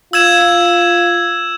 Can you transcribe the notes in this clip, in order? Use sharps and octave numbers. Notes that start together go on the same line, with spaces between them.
F4 E6 G#6 E7